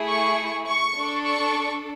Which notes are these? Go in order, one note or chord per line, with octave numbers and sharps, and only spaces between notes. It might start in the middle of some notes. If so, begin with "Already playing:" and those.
Already playing: A3 E4 G#4
C#6
C#6
D4 A4
C#6